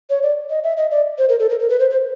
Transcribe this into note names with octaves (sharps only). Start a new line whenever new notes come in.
C#5
D5
D#5
E5
D#5
D5
C5
A#4
A4
A#4
A#4
B4
C5
C5